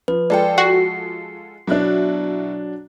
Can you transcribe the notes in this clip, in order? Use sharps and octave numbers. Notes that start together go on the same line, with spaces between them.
F3 B4
G#3 F4 A4 D5 G5
F#4 C7
B2 F#3 D4 E4 F#6